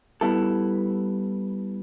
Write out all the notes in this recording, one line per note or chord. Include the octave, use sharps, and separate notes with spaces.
G3 B3 E4 A4